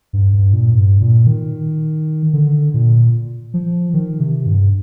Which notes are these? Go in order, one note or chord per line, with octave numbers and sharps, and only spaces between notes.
G2
G2
A#2
G2
A#2
D#3
D3
A#2
F3
D#3
C3
G2